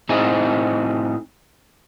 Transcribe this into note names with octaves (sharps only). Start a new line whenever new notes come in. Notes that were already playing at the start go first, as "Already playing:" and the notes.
A2 C4 D#4 G#4